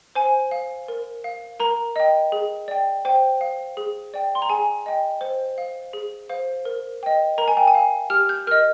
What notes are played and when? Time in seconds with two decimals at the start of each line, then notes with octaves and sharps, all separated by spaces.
0.15 C5 G#5
0.51 F5
0.88 A#4
1.24 F5
1.60 A#4 A#5
1.96 D#5 G5
2.32 G#4
2.68 D5 G5
3.05 C5 G5
3.41 F5
3.77 G#4
4.14 D5 G5
4.35 C6
4.42 A#5
4.49 G#4 G#5
4.86 D#5 G5
5.21 C5
5.58 F5
5.93 G#4
6.29 C5 F5
6.65 A#4
7.03 D#5 G5
7.38 A#4 A#5
7.48 G#5
7.57 G5
7.67 G#5
7.74 F5
8.10 G4 F6
8.29 G6
8.47 A#4 D#5 F6